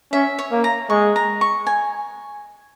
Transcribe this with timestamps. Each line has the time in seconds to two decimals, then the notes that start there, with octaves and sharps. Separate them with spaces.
0.13 C#4 E5
0.39 C#5
0.52 A#3
0.64 A#5
0.90 G#3 C#6
1.16 A#5
1.41 C#6
1.67 G#5